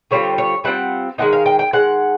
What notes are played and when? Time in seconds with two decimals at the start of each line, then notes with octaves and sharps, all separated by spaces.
0.11 D3 G3 C4 F4 C#5
0.38 C#5
0.64 D3 G3 C4 F4 F#5
1.18 D#3 G#3 C4 D#4 F#5
1.32 F5
1.46 G5
1.59 G5
1.73 D#3 G#3 F#5